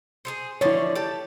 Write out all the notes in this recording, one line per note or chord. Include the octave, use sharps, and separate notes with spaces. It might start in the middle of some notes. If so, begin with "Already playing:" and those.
G#4 A4 C5
D3 F3 E4 C#5 D5
G4 A5